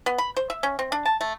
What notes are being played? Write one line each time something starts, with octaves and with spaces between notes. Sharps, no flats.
B3
B5
C5
E5
C#4
C4
D4
A5
A3